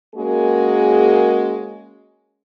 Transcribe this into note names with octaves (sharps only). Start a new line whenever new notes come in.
G#3 A#3 C#4 F#4 G#4 A#4